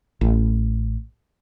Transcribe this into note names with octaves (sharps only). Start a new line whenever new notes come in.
A1